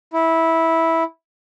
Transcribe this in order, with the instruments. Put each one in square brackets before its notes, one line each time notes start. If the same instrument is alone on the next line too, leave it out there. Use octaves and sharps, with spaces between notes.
[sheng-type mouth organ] E4